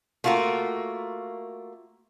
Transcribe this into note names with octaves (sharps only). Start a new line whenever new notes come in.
A3 A#3 F4 F#4 A#4